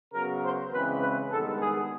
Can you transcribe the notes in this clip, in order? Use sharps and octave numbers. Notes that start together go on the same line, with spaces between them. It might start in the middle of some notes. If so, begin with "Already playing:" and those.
C#3 F#3 B3 A#4
C5
E2 C#3 E3 G#3 C4 B4
B4
G2 D#3 G#3 B3 A4
G#4